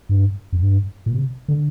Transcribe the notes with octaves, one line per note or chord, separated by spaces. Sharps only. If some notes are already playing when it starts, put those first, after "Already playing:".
G2
F2
G2
A#2
C3
D3